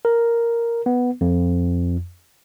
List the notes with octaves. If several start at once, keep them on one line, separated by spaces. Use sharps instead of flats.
A#4
B3
F2